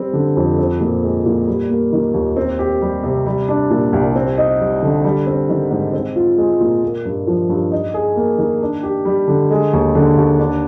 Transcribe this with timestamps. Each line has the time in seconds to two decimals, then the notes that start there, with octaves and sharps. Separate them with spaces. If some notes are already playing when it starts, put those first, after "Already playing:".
Already playing: G3 C4
0.13 D3
0.36 F2
0.58 C4
0.81 A#2
1.03 G#3
1.26 A#2
1.47 G3
1.69 A#3
1.93 D#3
2.14 D#2
2.37 C4
2.59 G4
2.82 G3
3.03 C3
3.26 G3
3.48 D4
3.70 A#2
3.93 C2
4.15 C4
4.38 D#4
4.59 G3
4.82 D3
5.04 G3
5.27 C4
5.49 D#3
5.71 G#2
5.93 C4
6.16 F4
6.38 G#3
6.60 A#2
6.83 A#3
7.05 G2
7.27 F3
7.49 G2
7.72 D#4
7.94 G#4
8.16 A#3
8.38 D#3
8.62 D4
8.83 G4
9.05 G3
9.28 D3
9.51 G#3
9.73 D#2
9.95 D3
10.17 D#2
10.39 D4